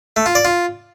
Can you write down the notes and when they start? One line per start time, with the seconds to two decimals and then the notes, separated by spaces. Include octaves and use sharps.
0.16 A3
0.26 F4
0.35 D5
0.45 F4